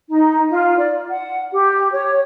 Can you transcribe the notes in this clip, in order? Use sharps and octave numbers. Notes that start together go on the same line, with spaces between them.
D#4
F4
D5
F#5
G4
C#5